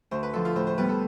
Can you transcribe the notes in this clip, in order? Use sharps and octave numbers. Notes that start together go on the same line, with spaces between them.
D2 C5
B4
D3 F3 A4
F4
A2 C5
C5
G3 B3 B4
A4